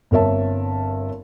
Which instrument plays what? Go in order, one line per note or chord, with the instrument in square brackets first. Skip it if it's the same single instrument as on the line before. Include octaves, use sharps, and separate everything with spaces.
[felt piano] G1 C4 A#4 C#5 E5 A5